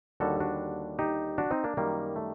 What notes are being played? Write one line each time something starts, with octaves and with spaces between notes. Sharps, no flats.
D#2 D3 G3 F#4 A4
D4 F#4
D#4 G4
D4 F#4
C4 D#4
A#3 D4
F#2 D#3 G3 A#3
A3